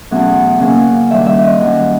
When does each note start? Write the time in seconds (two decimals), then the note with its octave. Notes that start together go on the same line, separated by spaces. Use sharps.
0.11 E2 B2 F#3 A3 C#4
0.59 C#3 F#3 A#3 C#4
1.10 G2 D#3 G3 E5
1.26 E5
1.43 D#5
1.60 F#2 D#3 G3